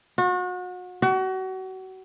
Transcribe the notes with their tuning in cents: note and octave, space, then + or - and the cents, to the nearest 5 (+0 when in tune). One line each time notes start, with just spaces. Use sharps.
F#4 -35
F#4 +30